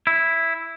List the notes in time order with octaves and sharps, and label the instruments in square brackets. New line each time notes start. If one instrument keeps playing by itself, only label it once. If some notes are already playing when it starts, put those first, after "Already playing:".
[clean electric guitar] E4